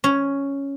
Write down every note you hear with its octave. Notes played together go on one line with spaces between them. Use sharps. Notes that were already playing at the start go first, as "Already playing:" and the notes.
C#4